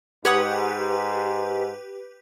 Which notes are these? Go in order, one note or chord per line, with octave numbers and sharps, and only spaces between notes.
G#2 G4 B4 C#5 F#5 D#6